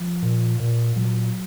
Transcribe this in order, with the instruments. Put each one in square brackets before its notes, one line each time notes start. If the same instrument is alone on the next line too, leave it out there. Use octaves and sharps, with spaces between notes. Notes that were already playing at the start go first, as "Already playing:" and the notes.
Already playing: [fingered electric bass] F3
A#2
A#2
A#2 F#3